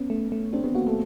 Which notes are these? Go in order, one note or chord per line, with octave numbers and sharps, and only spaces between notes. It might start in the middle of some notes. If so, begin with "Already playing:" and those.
Already playing: B3 C#4
A3
A3
C4 D4
B3
A#3 F#4
A3